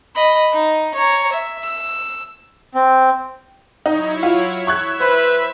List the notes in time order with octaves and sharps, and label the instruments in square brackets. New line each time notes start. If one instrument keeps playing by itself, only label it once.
[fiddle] D#5 B5
D#4
C#5 A#5
E5
E6
[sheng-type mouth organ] C4
[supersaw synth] F#3 E4 C#5 [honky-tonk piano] D#4
[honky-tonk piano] F4
[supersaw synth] E5 E6 [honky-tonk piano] C#6 F#6 G#6
[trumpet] B4 [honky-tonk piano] C5